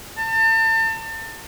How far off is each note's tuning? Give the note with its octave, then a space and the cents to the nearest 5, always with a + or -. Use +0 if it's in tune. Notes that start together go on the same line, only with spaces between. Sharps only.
A5 +35